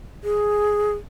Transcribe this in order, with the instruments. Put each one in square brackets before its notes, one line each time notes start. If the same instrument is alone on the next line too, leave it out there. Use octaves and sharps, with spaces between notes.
[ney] G#4